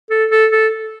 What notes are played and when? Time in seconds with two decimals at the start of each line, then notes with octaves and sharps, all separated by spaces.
0.10 A4
0.31 A4
0.52 A4